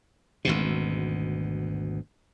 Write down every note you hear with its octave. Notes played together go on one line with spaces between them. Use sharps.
G#1 D2 B2